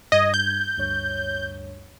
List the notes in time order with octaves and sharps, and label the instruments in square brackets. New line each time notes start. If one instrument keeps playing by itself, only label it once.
[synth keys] G2 G#6 [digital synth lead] D#5
[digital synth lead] G6
[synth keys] D2 G2 C#5